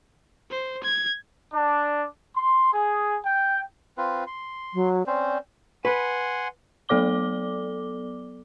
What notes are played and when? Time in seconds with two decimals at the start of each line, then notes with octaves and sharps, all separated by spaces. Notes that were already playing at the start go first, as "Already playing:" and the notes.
0.50 C5
0.83 G#6
1.53 D4
2.36 C6
2.73 G#4
3.24 G5
3.98 C4 F4 B4
4.27 C6
4.74 F#3
5.07 C4 C#4 C5 D5
5.85 B4 F#5 G#5 C6
6.89 F#3 B3 A4 D5 D6 G7